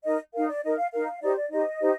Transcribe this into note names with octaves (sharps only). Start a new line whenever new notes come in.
D#4 A#4 D#5
D#4 A#4 F5
D5
D#4 A#4 D#5
F5
D#4 A#4 F5
D#4 G4 C5 D5
D5
D#4 G4 C5 D#5
D#4 G4 C5